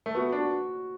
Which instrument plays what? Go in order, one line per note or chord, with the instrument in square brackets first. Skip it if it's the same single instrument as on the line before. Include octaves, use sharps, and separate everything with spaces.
[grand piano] A3
[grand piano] B3 [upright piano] F#4
[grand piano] D4
[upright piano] F#4